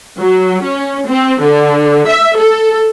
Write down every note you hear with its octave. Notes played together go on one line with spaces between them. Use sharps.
F#3
C#4
C4
D3
E5
A4